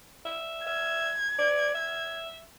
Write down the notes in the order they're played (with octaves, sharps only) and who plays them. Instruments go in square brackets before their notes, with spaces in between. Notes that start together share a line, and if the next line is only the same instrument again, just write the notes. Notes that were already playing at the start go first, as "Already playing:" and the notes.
[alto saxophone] E5
[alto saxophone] E5 [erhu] G#6
[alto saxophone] D5
E5